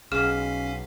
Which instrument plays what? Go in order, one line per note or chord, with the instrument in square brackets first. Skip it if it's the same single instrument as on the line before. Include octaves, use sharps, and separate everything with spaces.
[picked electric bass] B1 [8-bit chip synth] C#4 F5 B6 [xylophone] G#4 F6